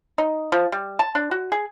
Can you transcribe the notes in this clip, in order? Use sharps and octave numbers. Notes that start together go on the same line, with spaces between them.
D#4
F3
G3
A5
D4
F#4
G#4